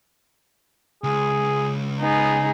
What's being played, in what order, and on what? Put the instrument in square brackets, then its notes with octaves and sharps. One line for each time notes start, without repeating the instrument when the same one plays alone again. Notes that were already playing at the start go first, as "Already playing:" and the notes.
[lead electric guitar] C#2 [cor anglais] G#4
[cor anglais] B3 [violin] D#4 G#4